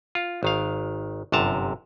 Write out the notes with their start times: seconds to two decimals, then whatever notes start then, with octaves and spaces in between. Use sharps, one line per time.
0.15 F4
0.43 G#1 D#3 F5
1.32 G1 F#2 C3 A5 A#5